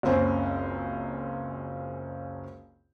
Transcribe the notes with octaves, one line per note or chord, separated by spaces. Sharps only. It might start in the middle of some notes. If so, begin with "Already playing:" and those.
F#1 C#2 C4 C#4 C5